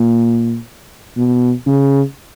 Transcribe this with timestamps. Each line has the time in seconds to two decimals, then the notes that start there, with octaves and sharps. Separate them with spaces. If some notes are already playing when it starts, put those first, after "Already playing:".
Already playing: A#2
1.17 B2
1.66 C#3